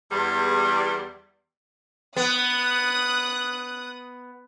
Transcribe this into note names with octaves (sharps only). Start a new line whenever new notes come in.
E2 G3
B3 D#6 F#6